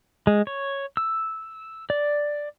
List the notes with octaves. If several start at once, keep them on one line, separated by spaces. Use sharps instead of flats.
G#3
C#5
E6
D5